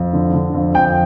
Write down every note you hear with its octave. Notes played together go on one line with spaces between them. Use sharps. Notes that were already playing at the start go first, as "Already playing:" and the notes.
Already playing: F2
D3
D3
F2
F2 G5